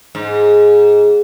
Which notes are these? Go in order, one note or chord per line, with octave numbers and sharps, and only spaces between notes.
G#2